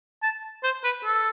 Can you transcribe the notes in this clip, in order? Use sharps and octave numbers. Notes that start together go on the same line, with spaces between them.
A5
C5
B4
A4